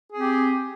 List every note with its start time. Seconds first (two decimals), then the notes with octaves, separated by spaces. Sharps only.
0.11 G#4
0.16 C4
0.21 G4